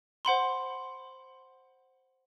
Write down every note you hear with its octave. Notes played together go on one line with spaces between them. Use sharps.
C5 F#5 B5 C6